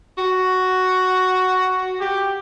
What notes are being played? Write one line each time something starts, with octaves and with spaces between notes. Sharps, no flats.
F#4
G4